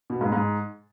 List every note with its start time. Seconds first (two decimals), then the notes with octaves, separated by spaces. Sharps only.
0.10 B2
0.21 G#2
0.32 G#2